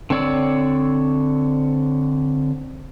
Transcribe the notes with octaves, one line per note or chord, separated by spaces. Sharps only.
D3 C4 C#5 D5 E6